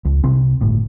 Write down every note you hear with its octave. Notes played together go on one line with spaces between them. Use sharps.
C#2
C2 C3 C4
G1 A2